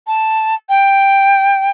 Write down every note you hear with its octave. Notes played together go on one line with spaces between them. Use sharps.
A5
G5